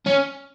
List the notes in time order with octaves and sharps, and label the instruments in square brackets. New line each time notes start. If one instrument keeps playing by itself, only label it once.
[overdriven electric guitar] C#4